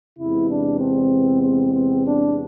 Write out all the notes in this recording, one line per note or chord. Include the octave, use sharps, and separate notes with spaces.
E2 C3 G#3 B3 E4
D4
C4
C4
C4
D4